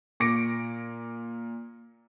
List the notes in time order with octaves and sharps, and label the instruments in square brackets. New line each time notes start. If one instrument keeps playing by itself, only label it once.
[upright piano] A#2 D6 A#6 C#7 D7